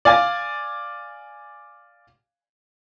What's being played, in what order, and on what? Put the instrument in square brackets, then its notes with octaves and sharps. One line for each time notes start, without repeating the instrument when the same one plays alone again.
[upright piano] D5 F5 G#5 A6